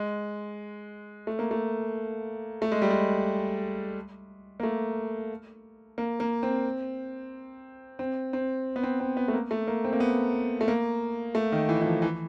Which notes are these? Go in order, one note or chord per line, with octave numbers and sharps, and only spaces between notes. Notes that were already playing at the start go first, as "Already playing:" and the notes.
Already playing: G#3
A3
A#3
A3
A3
G#3
G3
G#3
A#3
A3
A#3
A#3
C4
C4
C4
B3
C4
C4
B3
A3
A#3
A3
A#3
C4
A#3
B3
A3
A#3
A3
D#3
E3
E3
F3
E3